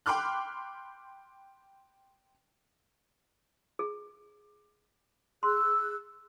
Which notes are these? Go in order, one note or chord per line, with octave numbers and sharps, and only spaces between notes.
G5 B5 C6 D6 F6 F#6
G#4
G#4 C6 E6 F#6